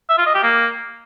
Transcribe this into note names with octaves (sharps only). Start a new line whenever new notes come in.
E5
F4
D#5
G4
A#3